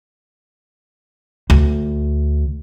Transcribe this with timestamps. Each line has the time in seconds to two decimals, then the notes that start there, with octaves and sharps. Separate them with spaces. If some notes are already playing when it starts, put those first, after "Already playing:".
1.50 D2